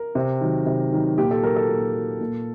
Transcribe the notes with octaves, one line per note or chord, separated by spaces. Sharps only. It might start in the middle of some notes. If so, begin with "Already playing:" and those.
Already playing: A#4
C3
D#3 F#3
C3
D#3 F#3
A#2 G4
A4
F#3 A#4
A4
A#2
F#3
A#2